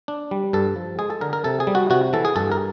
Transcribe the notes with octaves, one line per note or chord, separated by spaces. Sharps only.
D4
G3
G2 A4
F3
G#3 G#4
A4
D3 A#4
A#4
C3 A4
G#4
G3
F#4
C3 F#4
E3 A4
G#4
G2 A4
A#4